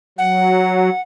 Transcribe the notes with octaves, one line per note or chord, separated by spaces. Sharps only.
F#3 F#5